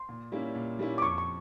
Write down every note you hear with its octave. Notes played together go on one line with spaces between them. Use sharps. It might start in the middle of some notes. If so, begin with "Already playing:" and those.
Already playing: C6
A#2
G3 A#3 C#4 E4
A#2
G3 A#3 C#4 E4
D6
F2 C#6
C#6